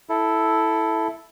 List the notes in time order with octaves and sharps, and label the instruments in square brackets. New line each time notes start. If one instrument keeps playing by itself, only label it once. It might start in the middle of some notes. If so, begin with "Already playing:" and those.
[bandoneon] E4 A4